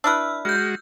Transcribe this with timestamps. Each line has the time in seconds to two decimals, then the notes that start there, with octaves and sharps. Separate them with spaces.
0.04 D4 E4 B4 E6 F6
0.45 G#3 F#4 F6 G6